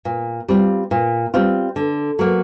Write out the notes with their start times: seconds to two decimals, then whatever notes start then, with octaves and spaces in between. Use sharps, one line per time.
0.05 A#2
0.48 G3 C4 F4
0.91 A#2
1.34 G3 C4 F4
1.76 D3
2.19 F#3 A#3